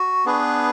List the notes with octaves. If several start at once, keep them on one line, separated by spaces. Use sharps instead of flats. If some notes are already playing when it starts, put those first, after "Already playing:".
Already playing: F#4
B3 D4 G#4 B4